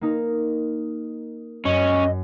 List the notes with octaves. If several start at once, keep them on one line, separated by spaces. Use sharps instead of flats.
A#3 D#4 A#4
F#2 C#4 D#5